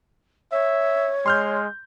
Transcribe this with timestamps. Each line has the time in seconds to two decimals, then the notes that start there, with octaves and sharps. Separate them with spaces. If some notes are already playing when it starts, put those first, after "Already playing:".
0.52 C#5 E5
1.26 G#3 C6 F6 G6